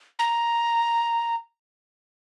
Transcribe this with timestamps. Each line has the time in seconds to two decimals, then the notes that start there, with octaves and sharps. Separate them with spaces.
0.19 A#5